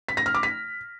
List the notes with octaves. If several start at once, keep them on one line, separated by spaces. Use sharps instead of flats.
B6
A#6
F6
D6
B6